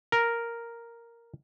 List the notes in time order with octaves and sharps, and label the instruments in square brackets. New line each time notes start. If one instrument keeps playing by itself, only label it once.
[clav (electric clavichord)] A#4